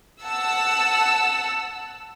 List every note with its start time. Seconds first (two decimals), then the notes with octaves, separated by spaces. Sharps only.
0.22 F#5 A5 E6